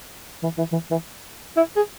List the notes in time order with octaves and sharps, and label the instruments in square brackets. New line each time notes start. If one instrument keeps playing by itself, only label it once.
[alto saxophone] E3
E3
E3
E3
E4
G#4